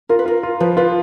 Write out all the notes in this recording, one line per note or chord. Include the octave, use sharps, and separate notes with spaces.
F4 A#4
B4
F4 A#4
F4
F3 B4
F4 B4